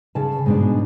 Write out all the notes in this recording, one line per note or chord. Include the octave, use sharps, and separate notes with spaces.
C#3 A5
G#2 B2 D4